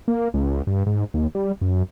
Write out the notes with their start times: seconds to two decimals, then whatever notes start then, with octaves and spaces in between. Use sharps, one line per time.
0.08 A#3
0.34 C#2
0.67 G2
0.86 G#2
1.14 D#2
1.35 G3
1.61 F#2